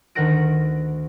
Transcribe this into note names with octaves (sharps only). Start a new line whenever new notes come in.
D2 D#3 A#4 F#5 A#6 D7